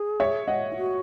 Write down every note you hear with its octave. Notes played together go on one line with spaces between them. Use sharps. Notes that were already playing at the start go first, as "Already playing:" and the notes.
Already playing: G#4
C#5 E5
D#5 F#5
E4
F#4